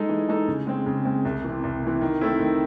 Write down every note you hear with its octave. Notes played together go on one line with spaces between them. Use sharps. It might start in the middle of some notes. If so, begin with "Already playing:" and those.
Already playing: G#3 D#4 A4
E3
G#3 D#4 A4
C#3
G#3 C4
C#3
G#3 C4
C2
C3 E3
C2
C3 E3
D#3
A3 C4 E4
D#3